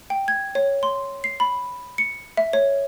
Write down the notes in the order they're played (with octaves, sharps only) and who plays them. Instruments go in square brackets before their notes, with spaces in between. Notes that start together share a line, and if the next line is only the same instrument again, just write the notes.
[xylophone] G5
G#6
C#5
C6
C7
B5
C#7
E5
C#5